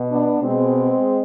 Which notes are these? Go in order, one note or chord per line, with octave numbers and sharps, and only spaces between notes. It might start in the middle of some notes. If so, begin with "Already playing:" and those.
Already playing: B2
B3 D4
B2 G#3 C4